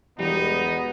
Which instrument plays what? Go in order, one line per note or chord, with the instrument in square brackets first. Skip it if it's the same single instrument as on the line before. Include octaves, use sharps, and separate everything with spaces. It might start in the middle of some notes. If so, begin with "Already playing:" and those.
[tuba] E1 [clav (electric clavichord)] E3 G3 [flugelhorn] B3 [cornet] D#4